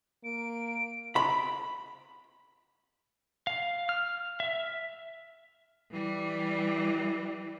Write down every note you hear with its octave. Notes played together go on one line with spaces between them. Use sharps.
A#3 D7
B5
F5
F6
E5
E3 G3